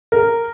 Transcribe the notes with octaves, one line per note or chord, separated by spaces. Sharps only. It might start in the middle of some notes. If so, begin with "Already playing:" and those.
A#4